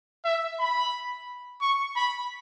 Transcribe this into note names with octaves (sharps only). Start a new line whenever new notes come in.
E5
B5
C#6
B5